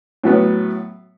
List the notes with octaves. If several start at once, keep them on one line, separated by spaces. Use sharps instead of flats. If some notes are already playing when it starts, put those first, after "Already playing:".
A2 F#3 B3